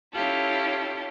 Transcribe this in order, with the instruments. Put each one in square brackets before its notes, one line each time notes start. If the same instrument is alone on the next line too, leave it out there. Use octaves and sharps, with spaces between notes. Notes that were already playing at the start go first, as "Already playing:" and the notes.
[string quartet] C#4 E4 F4 G4 A4